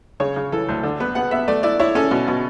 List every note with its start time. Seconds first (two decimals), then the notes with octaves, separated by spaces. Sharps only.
0.20 C#3 C#5
0.36 C#3
0.52 E3 A4
0.69 D2
0.83 D3
1.00 B3 B4
1.15 B3 F#5
1.31 B3 E5
1.48 A3 D5
1.63 E4 D5
1.79 E4 C#5
1.95 C#4 A4
2.11 B2
2.28 B2